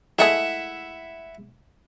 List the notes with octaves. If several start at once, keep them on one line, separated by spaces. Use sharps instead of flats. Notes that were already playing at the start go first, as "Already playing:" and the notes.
G#3 A3 E4 G#4 E5 F#5